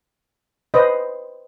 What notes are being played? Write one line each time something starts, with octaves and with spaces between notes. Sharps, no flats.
B4 C5 D#5